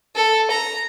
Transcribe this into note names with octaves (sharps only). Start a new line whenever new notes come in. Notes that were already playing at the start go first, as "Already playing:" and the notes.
A4
A#5